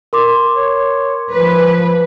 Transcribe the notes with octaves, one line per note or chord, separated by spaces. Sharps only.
A#4 C6 D6
C#5
F3 B4